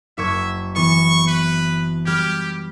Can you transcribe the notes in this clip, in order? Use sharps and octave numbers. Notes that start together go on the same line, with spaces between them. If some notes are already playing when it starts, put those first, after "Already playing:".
F#1 E5 C#6 G#6
E3 B3 C#6
B4
G3 G4 F6 G#6